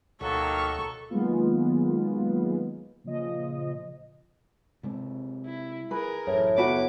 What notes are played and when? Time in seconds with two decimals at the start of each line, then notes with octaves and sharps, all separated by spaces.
0.21 D2 B2 D#3 F#3 A#3 A4 C#6
1.10 D#3 F#3 G#3 A#3 B3 F4
3.04 A#2 C#3 F3 D#5
4.83 C3 G#3 C4
5.46 E4
5.91 G#4 A#4 B4
6.27 A1 F#2 A2
6.57 F#1 B3 F#4 B4 C#5 D6